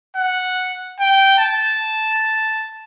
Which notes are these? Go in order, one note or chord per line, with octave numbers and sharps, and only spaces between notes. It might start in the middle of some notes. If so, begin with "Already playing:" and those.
F#5
G5
A5